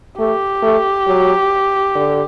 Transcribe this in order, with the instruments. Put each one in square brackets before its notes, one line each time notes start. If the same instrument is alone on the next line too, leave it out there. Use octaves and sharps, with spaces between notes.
[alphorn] A3 [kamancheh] G4
[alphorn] A3
F#3
D3